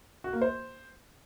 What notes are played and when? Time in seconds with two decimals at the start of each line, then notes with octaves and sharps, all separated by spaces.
0.24 F#4
0.33 A#3
0.42 C5